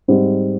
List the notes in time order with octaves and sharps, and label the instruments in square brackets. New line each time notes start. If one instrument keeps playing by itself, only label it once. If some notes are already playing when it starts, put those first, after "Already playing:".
[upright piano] G#2 G3 C4